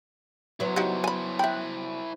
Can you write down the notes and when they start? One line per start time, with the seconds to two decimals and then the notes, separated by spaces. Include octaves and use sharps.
0.60 F#3 B3 E4 C5
0.76 D#4 F#4 G4
1.04 G#5 B5
1.39 E5 G5 B5 F#6